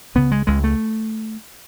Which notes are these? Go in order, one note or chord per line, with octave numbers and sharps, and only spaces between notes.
C#2 C#3 B3
G#3
C#2 C#3 G#3
A3